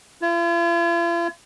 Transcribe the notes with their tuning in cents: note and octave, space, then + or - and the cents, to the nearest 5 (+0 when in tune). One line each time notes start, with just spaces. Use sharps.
F4 -45